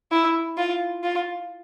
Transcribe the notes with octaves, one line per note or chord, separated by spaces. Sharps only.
E4
F4
F4